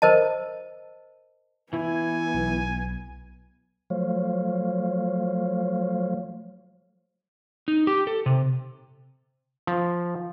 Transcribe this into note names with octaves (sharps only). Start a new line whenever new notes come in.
A#4 C5 D#5 A5
E3 B3 E4 G#5
B1
F3 F#3 A3 C5 C#5 F5
D#4
G4
A4
C3
F3